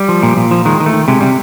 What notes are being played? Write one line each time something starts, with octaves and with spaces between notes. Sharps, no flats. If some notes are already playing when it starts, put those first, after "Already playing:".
Already playing: G3
F3
A#2
A#2
F3
D#3 G#3
D#3
A3
D#3
C3 G#3
C3 G3